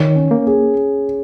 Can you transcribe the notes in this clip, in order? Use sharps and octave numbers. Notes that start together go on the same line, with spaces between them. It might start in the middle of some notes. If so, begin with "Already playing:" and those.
Already playing: D#3 C#5
C#4
A#3
G#4